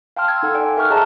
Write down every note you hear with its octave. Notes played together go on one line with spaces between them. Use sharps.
F5 G5 A5 C6 F6
E6 G#6
D#4 A4 F#5
D5 G5 G#5
A#4 E5 A#5 C#6 F6 F#6
G#4 C#5 D#5 E5 A5 A#5